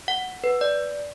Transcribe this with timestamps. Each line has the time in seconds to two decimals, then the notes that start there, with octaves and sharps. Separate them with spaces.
0.08 F#5
0.44 B4
0.61 D5